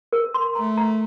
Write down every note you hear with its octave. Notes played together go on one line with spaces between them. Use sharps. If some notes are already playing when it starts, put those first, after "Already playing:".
A#4
C6
A3 A#5
A#5